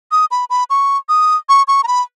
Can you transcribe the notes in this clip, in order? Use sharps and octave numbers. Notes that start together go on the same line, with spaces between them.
D#6
B5
B5
C#6
D#6
C#6
C#6
A#5
B5